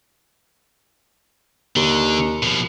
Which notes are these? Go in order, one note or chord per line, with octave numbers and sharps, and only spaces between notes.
D#2 D3
B2 F3